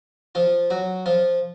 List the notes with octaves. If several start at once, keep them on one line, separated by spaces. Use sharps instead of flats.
F3 F4
F#3 F#4
F3 F4